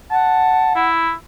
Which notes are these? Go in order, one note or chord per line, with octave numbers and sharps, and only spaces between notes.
F#5 A5
E4